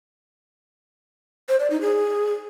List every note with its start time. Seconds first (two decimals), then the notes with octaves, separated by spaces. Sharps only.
1.49 C5
1.60 D5
1.70 D#4
1.81 G#4